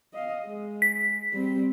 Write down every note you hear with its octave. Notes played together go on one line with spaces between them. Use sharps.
D#5 F5
G#3
B6
G3 C4